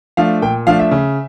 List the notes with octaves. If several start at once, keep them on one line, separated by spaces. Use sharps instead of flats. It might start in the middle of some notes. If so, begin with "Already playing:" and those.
F3 A3 D4 F5
A#2 G5
F3 A3 D4 F5
E5
C#3